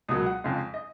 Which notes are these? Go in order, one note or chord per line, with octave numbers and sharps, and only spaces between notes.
C#2 B2 F#3 A#3 D#6
F#5
F2 C#3 G#3 F5
D#5